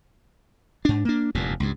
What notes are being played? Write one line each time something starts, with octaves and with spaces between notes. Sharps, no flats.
G#2 D4
A#3 D4
F1 E2 G2 A#2
C#2 G2